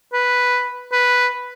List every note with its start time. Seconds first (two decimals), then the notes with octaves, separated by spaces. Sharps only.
0.13 B4
0.92 B4